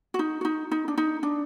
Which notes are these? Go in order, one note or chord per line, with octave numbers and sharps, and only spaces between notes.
F#4
D#4
F#4
D#4
D#4
D4
D#4
D4